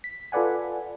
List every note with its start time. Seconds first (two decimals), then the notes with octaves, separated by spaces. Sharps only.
0.04 B6
0.32 F4 A4 B4 D5 F#5 G#5